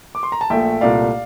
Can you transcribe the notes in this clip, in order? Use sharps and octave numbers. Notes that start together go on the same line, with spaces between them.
D6
C6
A#5
A5
A#1 A#2 A3 E5 G5
C2 A#2 A3 D5 F5